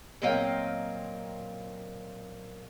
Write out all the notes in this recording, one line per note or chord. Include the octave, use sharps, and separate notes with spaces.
A#2 F#3 C4 D#5 F5 G5